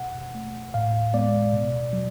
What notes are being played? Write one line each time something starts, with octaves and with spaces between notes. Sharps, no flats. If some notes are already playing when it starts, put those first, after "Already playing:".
Already playing: B2 F#5
A3
A2 F5
G#3 B3 D5
B2
F#3